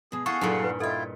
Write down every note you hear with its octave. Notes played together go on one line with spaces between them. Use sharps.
B2 G#3 G#4
E4 G#4 A4 F5 F#5 C#6
G2 A#2 F#3 D#4 E4 G#4 A4
E4 B4
E4 F4 A4 D#5 F#5 G5